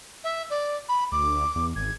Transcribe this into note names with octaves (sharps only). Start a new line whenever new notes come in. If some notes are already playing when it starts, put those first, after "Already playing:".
E5
D5
B5
D2 D6
E2
G#1 G#6